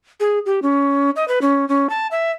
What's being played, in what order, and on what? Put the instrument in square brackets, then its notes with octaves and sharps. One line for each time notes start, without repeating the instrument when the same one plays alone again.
[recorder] G#4
G4
C#4
D#5
B4
C#4
C#4
A5
E5